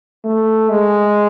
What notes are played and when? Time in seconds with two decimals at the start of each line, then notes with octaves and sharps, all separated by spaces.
0.24 A3
0.69 G#3